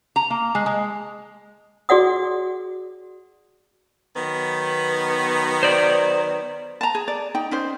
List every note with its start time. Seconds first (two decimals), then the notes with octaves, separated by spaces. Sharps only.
0.16 A#5
0.30 A#3
0.55 G#3
0.66 G#3
1.89 F#4 G#4 D5 F#5 D#6
4.16 D#3 F#3 B3
5.63 C5 D5
6.81 A5 A#5
6.95 G#4
7.08 D5
7.35 D#4 G5
7.51 C#4 D#4 C5